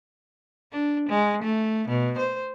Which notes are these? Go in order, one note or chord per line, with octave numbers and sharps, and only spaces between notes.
D4
G#3
A3
B2
C5